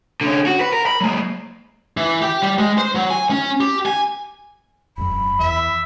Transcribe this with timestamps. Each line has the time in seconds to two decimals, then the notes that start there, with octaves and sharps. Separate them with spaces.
0.21 D3 C#4
0.46 F#4
0.61 B4
0.73 A#4
0.86 B5
1.01 F#3 G#3
1.97 E3
2.22 G4
2.43 G3
2.58 G#3
2.78 C5
2.95 F#3
3.10 G#5
3.30 C#4
3.61 G4
3.86 G#5
4.98 E1 F#2 B5
5.39 E2 E5